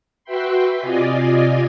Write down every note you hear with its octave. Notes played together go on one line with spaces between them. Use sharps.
F#4 B4 E5 G5 B5 C6
C3 F4 D5 D#5 G#5